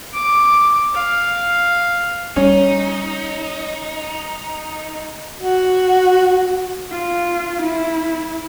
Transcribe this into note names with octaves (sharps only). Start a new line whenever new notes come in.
D6
F5
G3 C#4 D#4
F#4
F4
E4